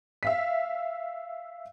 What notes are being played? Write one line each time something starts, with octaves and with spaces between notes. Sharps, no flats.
E5 F5 B6